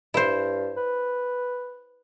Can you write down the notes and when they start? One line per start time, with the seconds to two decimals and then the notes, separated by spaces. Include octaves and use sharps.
0.14 G2 E4 C5
0.77 B4